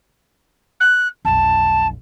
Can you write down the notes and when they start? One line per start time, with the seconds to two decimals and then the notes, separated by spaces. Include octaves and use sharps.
0.80 F#6
1.25 F1 B1 A5